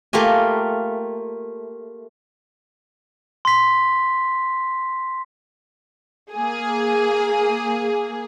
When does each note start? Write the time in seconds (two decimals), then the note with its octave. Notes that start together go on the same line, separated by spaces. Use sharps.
0.13 A3 A#3 F4 G4 G#5
3.45 C6 B6
6.32 A#3 G#4